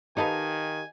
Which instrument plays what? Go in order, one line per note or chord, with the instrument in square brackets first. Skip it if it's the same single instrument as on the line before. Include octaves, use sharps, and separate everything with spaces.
[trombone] D#3 [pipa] D#4 A4 B4 [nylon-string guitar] G4 D#5 F5 [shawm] G#5